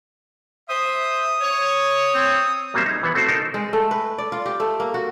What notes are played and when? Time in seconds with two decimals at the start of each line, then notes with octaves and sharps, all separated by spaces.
0.69 C5 E5 D#6
1.41 C#5
2.14 C4
2.74 F#3 G3 A#3 C4 E5
2.86 D#4 G#4
3.03 E3 B3 F#5
3.15 A3 C4 F#4 C5
3.28 D#4 A4 A#4 C5
3.54 G#3
3.73 A3
3.91 B4
4.18 D5
4.32 F4
4.46 G4
4.60 A3
4.80 A#3
4.94 F#4